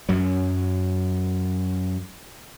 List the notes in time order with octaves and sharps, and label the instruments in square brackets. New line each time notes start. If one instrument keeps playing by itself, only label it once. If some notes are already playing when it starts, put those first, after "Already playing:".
[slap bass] F#2 F#3